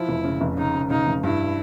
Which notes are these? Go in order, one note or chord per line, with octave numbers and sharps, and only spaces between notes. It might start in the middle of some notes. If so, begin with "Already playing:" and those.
Already playing: F3 E4
F1
C#3
F1
C#3 D#4
C#3
C#3 D#4
F1
G2 E4